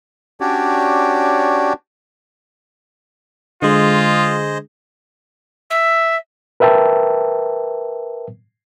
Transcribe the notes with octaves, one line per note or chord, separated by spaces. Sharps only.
C#4 D4 F#4 G4 C#5 D5
D3 G#3 F4 G#4 C5 D#5
E5
A#4 B4 E5 G5 A5